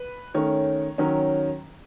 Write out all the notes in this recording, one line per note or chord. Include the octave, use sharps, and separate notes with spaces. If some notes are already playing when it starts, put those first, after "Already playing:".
Already playing: B4
D#3 A3 C#4 C#5
D#3 F#3 C#4